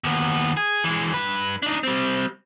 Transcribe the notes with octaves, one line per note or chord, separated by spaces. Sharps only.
D#2 B3
G#4
E3 G#3
G2 B4
D4 D#4
G3 C4